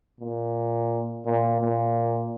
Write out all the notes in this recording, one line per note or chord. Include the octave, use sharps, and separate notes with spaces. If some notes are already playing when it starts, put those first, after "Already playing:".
A#2
A#2
A#2